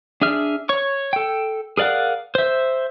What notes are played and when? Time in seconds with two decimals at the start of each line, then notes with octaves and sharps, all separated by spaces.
0.21 D4 G#4 E5 F6
0.69 C#5 C#6
1.13 A4 G5
1.77 G#4 A#4 D5 F5 F#5
2.35 C5 E5